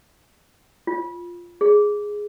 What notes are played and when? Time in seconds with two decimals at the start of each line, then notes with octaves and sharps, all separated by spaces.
0.87 F4
1.61 G#4